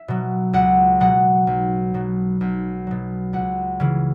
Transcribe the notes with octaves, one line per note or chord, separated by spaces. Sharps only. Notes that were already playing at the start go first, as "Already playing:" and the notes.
Already playing: E5
B2 F#3
C#2 F#5
B2 F#3 F#5
B1
B2 F#3
B1
B2 F#3
C#2 F#5
C#3 E3